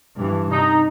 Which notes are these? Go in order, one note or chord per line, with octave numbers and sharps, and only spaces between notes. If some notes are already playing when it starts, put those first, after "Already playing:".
G2 E3
C3 D#4